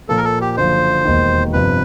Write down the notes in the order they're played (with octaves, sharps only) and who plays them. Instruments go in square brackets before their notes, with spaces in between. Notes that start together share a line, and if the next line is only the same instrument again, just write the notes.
[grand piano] A#2 F3 A#3 [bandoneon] A4
[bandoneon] A#4
A4
G4
[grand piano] F#1 F#2 D3 F3 [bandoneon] C5
[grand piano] E1 D#2 D#3
[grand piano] G1 F2 C3 F3 [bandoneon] B4